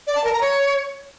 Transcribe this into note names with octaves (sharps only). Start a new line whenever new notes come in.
D5
A5
A#4
A#5
C#5